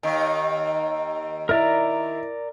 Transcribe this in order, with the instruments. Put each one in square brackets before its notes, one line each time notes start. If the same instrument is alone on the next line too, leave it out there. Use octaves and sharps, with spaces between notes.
[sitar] D#2 D#3
[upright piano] E4 [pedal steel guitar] A#4 D5 A#5